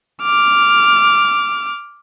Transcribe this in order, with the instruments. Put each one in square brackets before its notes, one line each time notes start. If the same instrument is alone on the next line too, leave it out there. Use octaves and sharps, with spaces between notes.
[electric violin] D6 F6